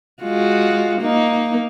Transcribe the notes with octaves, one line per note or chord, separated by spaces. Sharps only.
G#3 F4 F#4
A#3 D#4